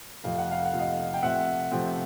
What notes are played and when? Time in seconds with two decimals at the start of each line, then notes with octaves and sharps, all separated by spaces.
0.23 F2 C3 F3 A3 F5
0.38 F#5
0.51 F5
0.65 F#5
0.73 F2 C3 F3 A3
0.79 D#5 F5
1.14 G5
1.22 C3 F3 A3 C4 E5 F#5
1.71 C3 F3 A3 C4